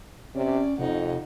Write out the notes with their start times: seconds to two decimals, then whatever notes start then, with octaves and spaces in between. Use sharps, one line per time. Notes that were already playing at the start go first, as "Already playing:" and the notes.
0.35 C3 C#4 D5
0.79 F2 C3 D#4 F#5